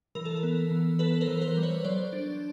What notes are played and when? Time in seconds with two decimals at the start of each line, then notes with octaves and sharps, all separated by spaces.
0.15 E3 A#4
0.25 A4
0.37 A#4
0.43 B3
0.71 E3
0.99 B3 A4 B4
1.21 A#4 C5
1.27 E3
1.41 A#4 C5
1.57 G3
1.63 B4 C#5
1.84 F#3 C5 D5
2.13 D4